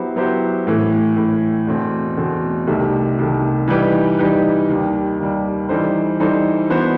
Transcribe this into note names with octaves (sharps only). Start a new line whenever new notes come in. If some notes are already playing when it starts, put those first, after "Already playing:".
Already playing: F#3 B3 E4 G4 C5
F#3 B3 E4 G4 C5
A2 E3 A3
A2 E3 A3
E2 B2 A3 C4
E2 B2 A3 C4
C2 C3 D#3 A3
C2 C3 D#3 A3
E3 G3 D#4 G4 B4
E3 G3 D#4 G4 B4
D#2 D#3 G3
D#2 D#3 G3
E3 G3 D#4 A4 C5
E3 G3 D#4 A4 C5
E3 B3 F#4 C5